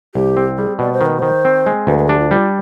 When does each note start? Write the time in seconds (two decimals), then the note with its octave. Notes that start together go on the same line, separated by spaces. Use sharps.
0.15 C2 G4
0.37 C4
0.58 G3 G#4
0.79 B2 D5
0.93 C5
1.01 D#3
1.06 B4
1.19 D#3 C5
1.45 C4
1.66 G#3
1.87 D2 B4
1.98 B4
2.08 D4 G4
2.20 F4
2.31 G3 F4